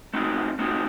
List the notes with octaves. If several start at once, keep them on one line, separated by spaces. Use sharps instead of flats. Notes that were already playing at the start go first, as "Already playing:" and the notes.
A3 C4 D#4 F#4
A3 C4 D#4 F#4